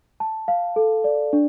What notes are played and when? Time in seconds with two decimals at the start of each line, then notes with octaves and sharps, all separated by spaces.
0.20 A5
0.48 F5
0.76 A4
1.04 D5
1.33 D4